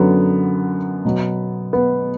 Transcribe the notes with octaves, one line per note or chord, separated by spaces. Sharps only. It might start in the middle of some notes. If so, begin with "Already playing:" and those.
Already playing: F#2 D3 F#3 B3
B2 F#3
B3